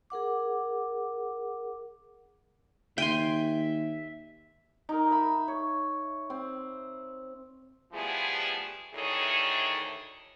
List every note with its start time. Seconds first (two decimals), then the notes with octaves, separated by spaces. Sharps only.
0.10 G#4 A#4 F#5 D6
2.98 D#2 E5 G5 G#5 C6
4.89 D#4 A#4
5.11 E5 B5
5.48 C#5
6.30 C4
7.93 F3 G3 A3 B3 E4 G#4
8.94 D2 D#3 E4 G#4 A4 C#5